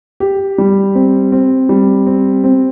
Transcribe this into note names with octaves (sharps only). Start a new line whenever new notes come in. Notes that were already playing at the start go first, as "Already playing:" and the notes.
G4
G3
C4
C4
G3
C4
C4